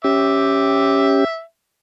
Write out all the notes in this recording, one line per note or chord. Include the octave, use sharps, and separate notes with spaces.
C#4 G4 E5 D6